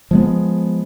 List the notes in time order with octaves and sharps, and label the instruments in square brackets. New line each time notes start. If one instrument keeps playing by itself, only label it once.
[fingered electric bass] F3 G#3 B3